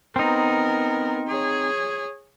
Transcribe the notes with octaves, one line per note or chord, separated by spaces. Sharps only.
B3 C4 D#4 A#4
G#4 C#5